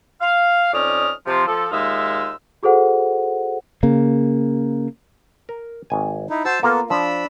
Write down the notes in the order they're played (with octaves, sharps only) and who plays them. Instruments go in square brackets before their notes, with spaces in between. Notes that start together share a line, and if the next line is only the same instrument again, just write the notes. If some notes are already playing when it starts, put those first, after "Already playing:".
[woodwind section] F5
F2 C#4 D#4 D5 D#6 F6
C3 F3
F3 A4
D#2 G#3 D#4 F4 E5 E6
[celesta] F#4 G#4 A4 C5 F#5
[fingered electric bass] C#3 A#3
[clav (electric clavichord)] A#4
G#1 G#5
[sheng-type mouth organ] D#4 E4
[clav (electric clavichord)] F#4 [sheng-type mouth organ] C5 A5 E6
[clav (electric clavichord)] A#3 F4 A#5 [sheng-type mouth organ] B3 A4
[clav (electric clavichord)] F3 [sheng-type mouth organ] D4 B5 E6